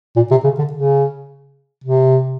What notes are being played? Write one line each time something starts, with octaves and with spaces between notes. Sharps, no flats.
A#2
C3
C#3
D3
C#3
C3